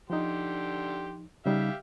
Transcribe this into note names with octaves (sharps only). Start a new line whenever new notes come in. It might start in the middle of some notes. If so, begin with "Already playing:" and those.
D3 F3 D#4 G4 C6
C#3 G3 D#4 G4 E5 F5